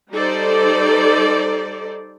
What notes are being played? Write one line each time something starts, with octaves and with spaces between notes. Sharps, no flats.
G3 D#4 A4 C5 D5